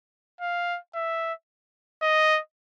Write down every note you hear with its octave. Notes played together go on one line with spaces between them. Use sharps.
F5
E5
D#5